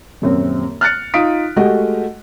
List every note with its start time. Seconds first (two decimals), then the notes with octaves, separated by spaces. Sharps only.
0.22 D#1 F#2 C4
0.81 F6 F#6 A6 C#7
1.14 D#4 F4 F5 D#6 B6 D7
1.56 G#3 A3 F#4 G4 D#5 F#5